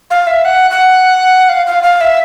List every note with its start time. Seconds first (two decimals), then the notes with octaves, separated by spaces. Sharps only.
0.10 F5
0.27 E5
0.45 F#5
0.71 F#5
1.49 F5
1.67 F5
1.83 F5
2.01 E5